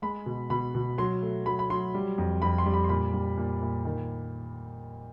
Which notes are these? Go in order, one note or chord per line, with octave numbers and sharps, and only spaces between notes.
G#3 B5
B2
B2 B5
B2
F#3 C6
A3
F#3 B5
B5
F#3 C6
G3
F2
F2 B5
C6
G3
B5
C6
A#2 B5
G3
A#2
A#2
D#3